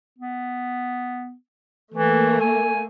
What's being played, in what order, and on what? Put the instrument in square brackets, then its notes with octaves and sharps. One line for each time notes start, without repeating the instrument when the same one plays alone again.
[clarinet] B3
[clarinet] E3 [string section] A3 A#3
[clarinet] G#5